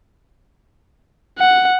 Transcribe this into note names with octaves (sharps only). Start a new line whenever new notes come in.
F#5